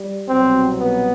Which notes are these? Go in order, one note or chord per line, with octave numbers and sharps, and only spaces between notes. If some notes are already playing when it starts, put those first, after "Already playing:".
Already playing: G3
C2 B2 F#3 C4
B3